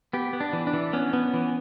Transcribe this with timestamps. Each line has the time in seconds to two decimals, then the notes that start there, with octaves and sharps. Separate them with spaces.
0.13 B3 G4
0.33 B3
0.40 D4
0.53 E3
0.67 D4
0.73 E3
0.93 B3 C#4
1.13 B3
1.34 E3